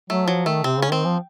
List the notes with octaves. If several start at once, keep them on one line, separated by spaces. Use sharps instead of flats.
F#3 A3
F3 F#3
D#3 A3
C3 C4
C#3 C#4
D#3 C4
F3